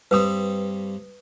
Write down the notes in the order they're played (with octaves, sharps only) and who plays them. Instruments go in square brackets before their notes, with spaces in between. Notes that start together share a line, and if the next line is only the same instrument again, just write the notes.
[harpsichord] G2 G3 C4 [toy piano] B4 D#6